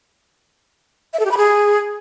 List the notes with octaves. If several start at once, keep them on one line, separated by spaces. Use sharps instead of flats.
E5
A4
G4
B5
G#4